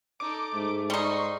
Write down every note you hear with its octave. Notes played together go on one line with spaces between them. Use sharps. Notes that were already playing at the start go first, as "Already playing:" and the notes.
D#4 A4 D6
G#2 A3
G3 D#4 C6 C#6